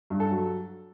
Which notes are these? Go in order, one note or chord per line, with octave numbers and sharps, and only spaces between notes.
G2
A4
F#3